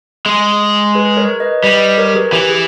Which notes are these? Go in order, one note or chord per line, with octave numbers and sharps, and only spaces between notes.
G#3
G#4 B4
A#4 C#5
B4 D#5
G3 B4 D#5
A#4 C#5
G#4 B4
E3 G4
G#4